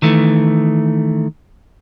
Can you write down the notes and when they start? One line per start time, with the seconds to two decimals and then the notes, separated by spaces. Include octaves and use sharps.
0.02 D#3 E3 A3